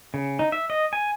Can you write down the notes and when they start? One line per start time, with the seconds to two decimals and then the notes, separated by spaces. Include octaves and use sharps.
0.14 C#3
0.39 D#4
0.52 E5
0.70 D#5
0.93 G#5